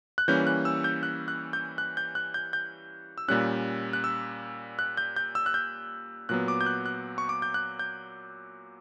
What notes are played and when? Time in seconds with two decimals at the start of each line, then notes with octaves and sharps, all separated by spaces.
0.18 F#6
0.28 E3 G3 A#3 C#4 G6
0.47 F#6
0.65 E6
0.84 G6
1.03 F#6
1.28 F#6
1.53 G6
1.78 F#6
1.97 G6
2.15 F#6
2.34 G6
2.53 G6
3.18 E6
3.28 A#2 G3 C#4 F#6
3.93 F#6
4.04 E6
4.79 F#6
4.97 G6
5.16 G6
5.35 E6
5.46 F#6
5.54 G6
6.29 A#2 F#3 B3 F#6
6.48 D6
6.61 G6
6.66 F#6
6.86 F#6
7.18 C#6
7.29 D6
7.42 G6
7.54 F#6
7.79 G6